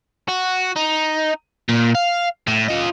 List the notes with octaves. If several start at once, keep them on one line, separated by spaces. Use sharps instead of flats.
F#4
D#4
A#2
F5
A2
F4 D#5